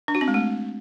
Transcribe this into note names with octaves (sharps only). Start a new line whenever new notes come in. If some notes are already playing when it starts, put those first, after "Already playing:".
D4
F#4
C4
G#3
A3